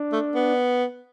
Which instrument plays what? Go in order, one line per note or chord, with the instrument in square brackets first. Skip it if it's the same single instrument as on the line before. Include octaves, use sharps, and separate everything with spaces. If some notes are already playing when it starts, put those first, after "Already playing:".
Already playing: [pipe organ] D4
[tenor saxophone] A3
B3